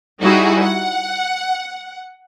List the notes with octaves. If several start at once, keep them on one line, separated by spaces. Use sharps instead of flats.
G3 D#4 E4 F#4 G#4
F#5